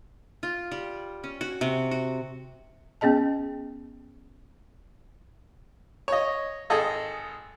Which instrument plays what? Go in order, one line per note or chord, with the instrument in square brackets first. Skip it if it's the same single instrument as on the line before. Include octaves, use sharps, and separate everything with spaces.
[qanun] F4
G3
C#4
F#4
C3
F#4
[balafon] B3 C#4 G#4 D#5 A5
[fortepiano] C#5 D#5
G#1 G#4 A4 D#5